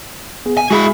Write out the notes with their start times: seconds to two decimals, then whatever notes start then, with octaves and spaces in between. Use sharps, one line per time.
0.46 B3 G#4
0.57 G#5
0.70 G#3 E4 F#4 G#4 B5